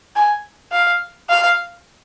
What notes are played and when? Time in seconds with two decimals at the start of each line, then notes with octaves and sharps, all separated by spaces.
0.16 G#5
0.72 F5
1.29 F5